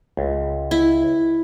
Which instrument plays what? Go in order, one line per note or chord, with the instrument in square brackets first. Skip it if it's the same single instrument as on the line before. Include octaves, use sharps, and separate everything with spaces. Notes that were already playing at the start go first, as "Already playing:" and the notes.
[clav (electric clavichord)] C#2
[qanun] E4